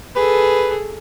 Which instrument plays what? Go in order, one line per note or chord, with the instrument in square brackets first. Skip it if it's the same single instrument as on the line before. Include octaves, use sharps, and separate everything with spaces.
[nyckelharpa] G#4 A4 [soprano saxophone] B4